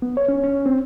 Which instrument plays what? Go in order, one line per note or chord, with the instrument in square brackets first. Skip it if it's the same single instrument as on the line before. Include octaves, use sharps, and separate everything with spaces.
[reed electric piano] B3
C#5
C#4
C#4
C4